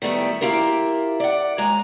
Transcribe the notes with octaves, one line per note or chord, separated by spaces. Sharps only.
D#3 G3 A3 B3 E4
A#3 E4 F4 G4 A#4
D5 F#5
D#2 G#3 G#5 A#5